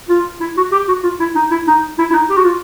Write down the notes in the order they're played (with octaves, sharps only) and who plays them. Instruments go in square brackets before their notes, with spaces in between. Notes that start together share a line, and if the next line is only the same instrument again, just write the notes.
[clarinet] F4
E4
F#4
G4
F#4
F4
E4
D#4
E4
D#4
E4
E4
D#4
G4
F#4
F4